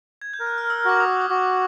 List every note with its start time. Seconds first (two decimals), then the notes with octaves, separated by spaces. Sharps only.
0.21 G#6
0.34 G6
0.40 A#4
0.46 F#6
0.58 F6
0.70 E6
0.85 F#4 D6
1.00 D#6
1.22 D#6
1.30 F#4 D6